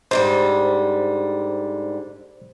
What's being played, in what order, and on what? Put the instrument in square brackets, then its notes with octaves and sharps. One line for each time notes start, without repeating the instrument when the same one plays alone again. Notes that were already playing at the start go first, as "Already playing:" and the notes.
[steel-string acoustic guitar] G#2 D3 G3 [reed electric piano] C5